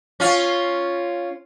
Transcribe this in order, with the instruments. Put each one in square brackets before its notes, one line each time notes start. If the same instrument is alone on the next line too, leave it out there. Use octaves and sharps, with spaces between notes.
[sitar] C#4 F4